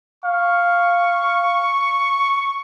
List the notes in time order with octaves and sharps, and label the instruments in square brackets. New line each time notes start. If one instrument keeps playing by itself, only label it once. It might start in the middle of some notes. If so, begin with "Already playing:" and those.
[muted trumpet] F5 [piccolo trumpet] C#6